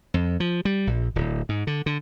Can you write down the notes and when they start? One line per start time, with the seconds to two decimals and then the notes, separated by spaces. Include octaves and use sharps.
0.14 F2
0.40 F3
0.65 G3
0.87 A#1
1.15 D1
1.49 G#2
1.67 D3
1.86 D3